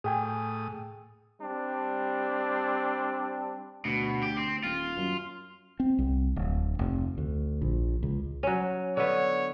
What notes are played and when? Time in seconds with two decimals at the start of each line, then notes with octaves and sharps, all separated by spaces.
0.04 A2 G#4 G5 G#5 D#6
1.40 G3 C4 D4
3.85 D2 B2
4.23 G4
4.37 C4
4.63 D#1 F4
4.96 F#2
5.80 C4
5.99 C2
6.36 D1
6.79 F1
7.18 D2
7.62 A#1
8.03 C#2
8.43 F#3 C#4
8.97 D3 B3 C#5